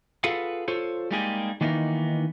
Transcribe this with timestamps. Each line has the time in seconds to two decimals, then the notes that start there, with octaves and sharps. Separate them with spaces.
0.24 F4 G#4 A4 B4 F5 F#5
0.68 F4 A4 C5 C#5
1.11 G3 G#3 A#3 D#4 G4 G#4
1.61 D#3 E3 A#3 B3 D#4